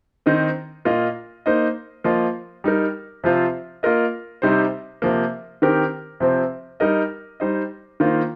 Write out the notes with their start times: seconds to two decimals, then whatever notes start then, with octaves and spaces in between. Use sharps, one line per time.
0.26 D#3 C4 D#4 C5 D#5
0.85 A#2 A#3 F4 D#5
1.46 A#3 D#4 C5 D#5
2.04 F3 A#3 F4 D#5
2.64 G3 D#4 A#4
3.24 C3 F3 C4 F4 C5
3.83 A#3 F4 A#4 D#5
4.42 C3 G3 C4 D#4 C5
5.02 C3 F3 A#3
5.62 D#3 C4 G4 A#4
6.20 C3 F3 C4
6.80 G3 D#4 A#4 D#5
7.40 G3 D#4 C5 D#5
8.00 D#3 A#3 F4 C5